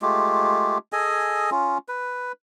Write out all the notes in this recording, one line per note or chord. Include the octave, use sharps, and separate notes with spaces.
G#3 A3 F4 G4
G#4 A4 D#5 G#5
C#4 F4
B4